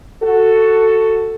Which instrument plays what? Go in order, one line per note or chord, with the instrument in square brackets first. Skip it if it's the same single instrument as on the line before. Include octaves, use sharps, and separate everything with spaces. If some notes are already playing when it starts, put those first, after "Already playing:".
[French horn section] F#4 A4